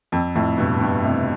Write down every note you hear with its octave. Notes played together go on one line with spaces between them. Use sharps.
F2
F2 A2
G2 B2
G2 B2
A2 C3